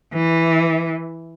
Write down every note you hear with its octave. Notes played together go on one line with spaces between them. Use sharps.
E3